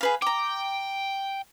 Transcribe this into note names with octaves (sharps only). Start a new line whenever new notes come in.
G#4 B4 F5
G5 A#5 D6